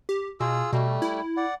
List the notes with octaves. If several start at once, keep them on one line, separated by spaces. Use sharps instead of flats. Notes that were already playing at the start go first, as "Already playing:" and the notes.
G4
B2 F4 G#4 E6
B2 G3 A3
E4
D5 F#5